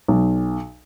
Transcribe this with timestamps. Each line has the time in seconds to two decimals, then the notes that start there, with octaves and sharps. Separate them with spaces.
0.08 B1